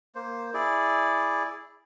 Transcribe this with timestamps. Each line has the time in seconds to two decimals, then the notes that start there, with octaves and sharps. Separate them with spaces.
0.15 A#3 C5
0.54 E4 G#4 D5